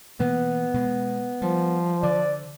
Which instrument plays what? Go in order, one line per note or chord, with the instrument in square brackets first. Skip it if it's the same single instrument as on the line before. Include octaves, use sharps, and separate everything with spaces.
[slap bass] B2 E3 A#3 [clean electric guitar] B3
[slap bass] B2 G#3
[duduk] F3 [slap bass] G3
[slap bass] D3 [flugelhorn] D5